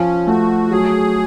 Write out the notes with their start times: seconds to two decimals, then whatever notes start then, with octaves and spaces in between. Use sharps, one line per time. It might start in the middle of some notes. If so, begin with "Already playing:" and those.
Already playing: F3 C#4
0.27 A3 F#4
0.71 F#3 G#4